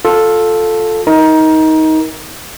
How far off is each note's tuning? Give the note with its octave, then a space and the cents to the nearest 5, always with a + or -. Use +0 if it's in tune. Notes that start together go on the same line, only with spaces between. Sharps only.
F4 +15 A4 +0
D#4 +20 A#4 +10